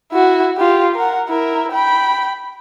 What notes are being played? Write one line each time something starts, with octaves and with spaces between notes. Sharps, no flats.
E4 F#4
F4 G4
A#4 F#5
E4 A#4
G5 B5